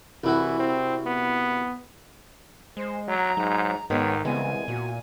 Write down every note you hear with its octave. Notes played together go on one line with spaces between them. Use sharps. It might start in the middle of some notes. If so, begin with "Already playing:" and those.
C2 E3 E4 F#4
C4
B3
G#3 C5
F#3 A#5
G#2 F#3
G#2 D#3 G#3 B3 C#5
C2 C#3 E3 G#3 B3 G#5
A#2 F#4